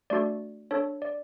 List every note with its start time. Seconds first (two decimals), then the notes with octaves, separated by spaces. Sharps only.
0.10 A3 D4 F#4 A4 D5
0.71 D4 A4 C#5
1.02 D5